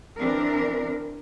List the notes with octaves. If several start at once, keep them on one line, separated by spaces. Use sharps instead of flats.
E3 C4 D4 A#4